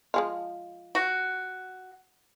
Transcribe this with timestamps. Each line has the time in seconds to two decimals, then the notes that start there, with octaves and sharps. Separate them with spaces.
0.14 F3 G#3 F4
0.95 F#4